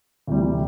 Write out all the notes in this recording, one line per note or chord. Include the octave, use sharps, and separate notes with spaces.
D2 C3 E3 G3